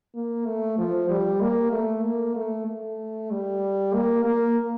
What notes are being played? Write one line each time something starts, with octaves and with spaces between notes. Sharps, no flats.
A#3
A3
F3
G3
A#3
A3
A#3
A3
A3
G3
A#3
A#3